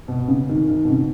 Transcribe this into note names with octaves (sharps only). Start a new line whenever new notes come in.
B2
C#3
D#3
D#3
B2
C#3